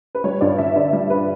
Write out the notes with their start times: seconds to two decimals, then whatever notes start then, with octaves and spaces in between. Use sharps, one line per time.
0.15 B4
0.24 G3 C#5
0.41 G2 D5
0.58 G2 E5
0.76 D3 D5
0.93 G3
1.10 B4